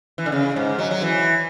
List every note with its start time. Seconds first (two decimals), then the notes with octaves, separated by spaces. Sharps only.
0.18 E3
0.26 D3
0.32 C#3
0.56 G#2
0.79 F#3
0.91 F#3
1.02 E3